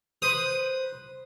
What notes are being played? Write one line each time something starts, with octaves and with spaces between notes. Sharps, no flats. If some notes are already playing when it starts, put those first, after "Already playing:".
B4 C5 D#6